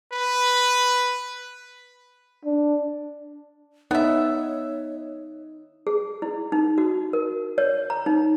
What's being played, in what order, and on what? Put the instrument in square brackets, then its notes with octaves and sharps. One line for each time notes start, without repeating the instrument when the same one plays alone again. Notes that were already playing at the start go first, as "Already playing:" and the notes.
[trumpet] B4
[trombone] D4
[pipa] B3 E5 [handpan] D#4 [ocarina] C#5
[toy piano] G#4
E4
D#4
F#4
A#4
C#5
A#5
D#4